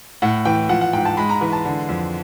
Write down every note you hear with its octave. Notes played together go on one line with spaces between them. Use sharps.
A2 F#5
E3 G5
F3 F#5
F#5
G#2 G5
A5
G#3 B5
A#5
E3
A5
D3
F2